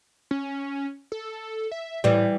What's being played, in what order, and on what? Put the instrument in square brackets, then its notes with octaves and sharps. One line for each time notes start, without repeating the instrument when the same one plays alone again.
[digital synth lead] C#4
A4
E5
[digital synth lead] A2 [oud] E3 G3